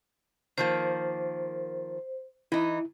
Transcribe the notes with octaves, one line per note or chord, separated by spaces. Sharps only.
D#3 F3 A#3 C5
E3 D#4 E4